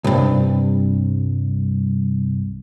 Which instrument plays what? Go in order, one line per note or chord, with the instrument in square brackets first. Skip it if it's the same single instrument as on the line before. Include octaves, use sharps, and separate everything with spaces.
[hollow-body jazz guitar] C2 G2